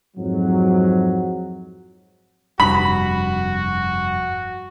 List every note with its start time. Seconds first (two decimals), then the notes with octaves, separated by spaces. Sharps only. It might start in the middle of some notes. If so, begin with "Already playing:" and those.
0.17 F2 G#2 F#3
2.60 F1 G2 F#4 B5